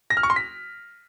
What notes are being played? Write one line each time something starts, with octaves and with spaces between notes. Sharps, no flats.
A#6
F6
C#6
C6
B6